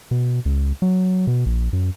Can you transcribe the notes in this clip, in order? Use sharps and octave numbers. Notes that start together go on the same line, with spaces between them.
B2
C#2
F#3
B2
A#1
F#2